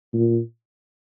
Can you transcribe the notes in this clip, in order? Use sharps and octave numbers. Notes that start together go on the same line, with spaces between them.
A#2